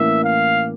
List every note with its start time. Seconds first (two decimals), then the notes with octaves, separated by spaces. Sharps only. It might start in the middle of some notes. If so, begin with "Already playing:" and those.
Already playing: A2 E3 A#3 C#4 E5
0.24 F5